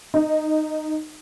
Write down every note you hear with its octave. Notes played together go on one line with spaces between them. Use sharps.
D#4